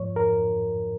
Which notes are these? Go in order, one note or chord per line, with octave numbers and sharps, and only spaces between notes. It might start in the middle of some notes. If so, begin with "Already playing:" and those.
Already playing: G#2 F3 C#5
A#4